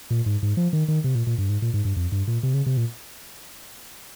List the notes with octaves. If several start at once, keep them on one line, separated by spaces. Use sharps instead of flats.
A#2
G#2
G#2
F3
D#3
D#3
C3
A#2
A#2
G2
G#2
A#2
G#2
G2
F2
G2
A#2
C3
C#3
C3
A#2